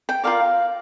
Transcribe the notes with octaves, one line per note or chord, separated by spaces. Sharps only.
G5
F4 A#4 D5 F5